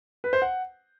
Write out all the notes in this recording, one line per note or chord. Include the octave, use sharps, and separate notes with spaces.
B4
C5
F#5